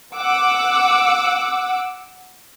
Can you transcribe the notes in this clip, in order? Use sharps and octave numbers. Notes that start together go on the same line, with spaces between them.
F#5 D6 E6